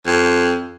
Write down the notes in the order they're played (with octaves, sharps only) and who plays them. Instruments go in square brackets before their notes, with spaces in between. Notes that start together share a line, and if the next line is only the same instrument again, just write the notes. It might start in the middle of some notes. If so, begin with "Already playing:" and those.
[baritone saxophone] F2